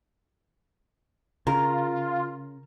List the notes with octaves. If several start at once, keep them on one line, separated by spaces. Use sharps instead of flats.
C#3 F4 A#4